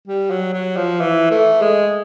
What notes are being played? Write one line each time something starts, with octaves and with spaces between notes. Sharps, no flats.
G3
F#3
F#3
F3
E3
A3
G#3